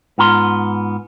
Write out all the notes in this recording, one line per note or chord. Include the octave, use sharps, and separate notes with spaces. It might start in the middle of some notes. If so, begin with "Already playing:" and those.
G#2 B3 F4 A#5 C6